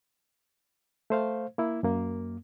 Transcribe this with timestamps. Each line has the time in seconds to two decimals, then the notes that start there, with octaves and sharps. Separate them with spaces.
1.10 A3 C5 F5
1.58 A#3 E4
1.83 F#2 A#3